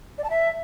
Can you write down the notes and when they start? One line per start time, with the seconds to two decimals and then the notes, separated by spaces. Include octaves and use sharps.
0.18 D5
0.24 A5
0.30 E5